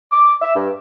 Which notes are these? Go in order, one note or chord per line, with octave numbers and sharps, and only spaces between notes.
D6
E5
G2